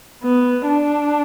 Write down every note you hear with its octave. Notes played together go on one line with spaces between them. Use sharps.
B3
D4